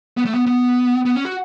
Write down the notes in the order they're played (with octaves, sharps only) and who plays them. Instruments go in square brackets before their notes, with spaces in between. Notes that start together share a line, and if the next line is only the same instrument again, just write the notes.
[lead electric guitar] B3
A3
B3
B3
B3
C#4
F#4